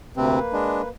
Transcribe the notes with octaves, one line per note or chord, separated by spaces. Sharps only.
D2 C3 A#3 C4 B4
G#3 D4